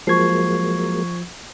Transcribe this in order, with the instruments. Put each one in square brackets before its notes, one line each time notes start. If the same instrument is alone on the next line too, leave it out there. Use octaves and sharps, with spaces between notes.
[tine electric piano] F3 G#6 [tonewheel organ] F#3 G#3 A#3 [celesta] C#6 C7